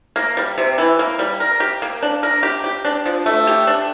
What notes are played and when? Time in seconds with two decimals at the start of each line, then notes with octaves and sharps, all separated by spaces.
0.16 A#3
0.37 G3
0.58 C3
0.78 E3
0.99 A#3
1.19 G3
1.40 A#4
1.60 G4
1.82 A#3
2.03 D4
2.23 A#4
2.43 G4
2.64 G4
2.85 D4
3.05 F3
3.26 A3
3.47 G4
3.67 D4